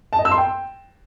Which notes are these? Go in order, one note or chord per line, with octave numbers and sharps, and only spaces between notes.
A5
D#5
E6
C6
G5